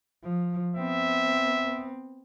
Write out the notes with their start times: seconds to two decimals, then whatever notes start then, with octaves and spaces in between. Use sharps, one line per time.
0.23 F3
0.76 B3 C4 E5